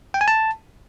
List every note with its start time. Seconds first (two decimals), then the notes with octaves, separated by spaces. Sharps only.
0.14 G5
0.21 G#5
0.28 A5